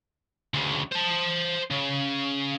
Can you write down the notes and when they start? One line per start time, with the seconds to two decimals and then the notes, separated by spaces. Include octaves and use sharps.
0.54 D2 C#3
0.92 C5 A5
1.71 C#3